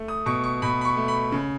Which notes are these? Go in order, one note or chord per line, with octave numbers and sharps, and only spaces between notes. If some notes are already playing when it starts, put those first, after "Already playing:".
Already playing: A3
D#6
B2 C#6
C#6
B2 B5
B5
C#6
A3
B5
C#3